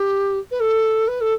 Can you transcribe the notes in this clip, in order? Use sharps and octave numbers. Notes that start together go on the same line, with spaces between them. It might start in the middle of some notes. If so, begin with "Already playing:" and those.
Already playing: G4
B4
A4
B4
A4